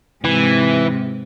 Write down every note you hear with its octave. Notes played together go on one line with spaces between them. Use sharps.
G#2 C3 E3